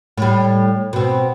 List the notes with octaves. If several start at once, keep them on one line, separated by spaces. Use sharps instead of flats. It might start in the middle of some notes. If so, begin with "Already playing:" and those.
A2 G3
B2 C4